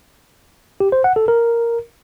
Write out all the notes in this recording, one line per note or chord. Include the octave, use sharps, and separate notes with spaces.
G4
C5
F#5
A4
A#4